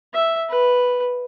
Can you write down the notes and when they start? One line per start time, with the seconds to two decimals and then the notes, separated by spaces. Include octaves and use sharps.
0.14 E5
0.50 B4